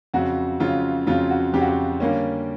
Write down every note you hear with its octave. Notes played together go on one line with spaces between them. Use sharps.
F2 C#3 F#3 F#4
F2 C#3 F#3 F4
F2 C#3 F#3 F4
F#4
F2 C#3 F#3 G4
F#4
G4
D3 G3 A#3 C#4